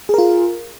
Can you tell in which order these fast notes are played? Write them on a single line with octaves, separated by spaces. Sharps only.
G#4 A#4 F4